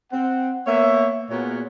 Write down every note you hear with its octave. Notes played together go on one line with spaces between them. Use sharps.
C4 F#5
A#3 B3 C#5 E5
A#2 B3 F#4 G#4 A#4 C#5